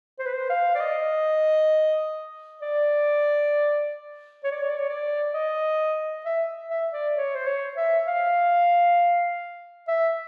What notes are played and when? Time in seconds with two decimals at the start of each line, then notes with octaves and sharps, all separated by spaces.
0.19 C5
0.26 B4
0.34 C5
0.50 F5
0.75 D5
0.80 D#5
2.62 D5
4.44 C#5
4.52 D5
4.62 C#5
4.70 D5
4.78 C#5
4.89 D5
5.34 D#5
6.25 E5
6.71 E5
6.93 D5
7.16 C#5
7.35 C5
7.46 C#5
7.77 E5
8.07 F5
9.88 E5